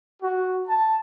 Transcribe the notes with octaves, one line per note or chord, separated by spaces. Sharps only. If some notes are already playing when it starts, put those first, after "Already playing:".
F#4
A5